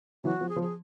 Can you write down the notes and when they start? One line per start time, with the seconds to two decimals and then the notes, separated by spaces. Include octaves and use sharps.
0.24 E3 F#3 F#4
0.41 F3
0.49 G#4
0.56 F3
0.62 G#4